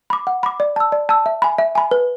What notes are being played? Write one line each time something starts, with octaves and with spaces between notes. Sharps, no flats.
B5 D6
F#5
B5 D6
D5
A5 E6
D5
A5 E6
E5
G#5 B5
E5
G#5 B5
B4